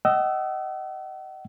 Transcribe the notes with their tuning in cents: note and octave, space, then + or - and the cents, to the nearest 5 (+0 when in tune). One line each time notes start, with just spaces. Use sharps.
D#5 +0 F#5 +40 E6 +0